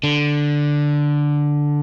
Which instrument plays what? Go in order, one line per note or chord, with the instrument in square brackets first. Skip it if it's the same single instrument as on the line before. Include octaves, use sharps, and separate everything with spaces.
[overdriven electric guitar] D3